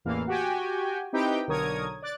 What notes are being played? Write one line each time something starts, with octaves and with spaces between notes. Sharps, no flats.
A1 E2 E3 A#3 F5
F#4 G4 G5 G#5
C4 D#4 E4 G4 B4 G5
B1 D3 A#4 C#5 D#6 G#6
D5 D6 F#6 A6